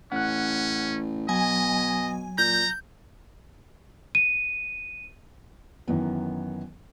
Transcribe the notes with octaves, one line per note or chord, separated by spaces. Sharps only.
A1 C#4 F#5 F#6
B2 F#3 D#5 G#5
A#2 A#5 G6
D#7
F#2 D#3 E3 B3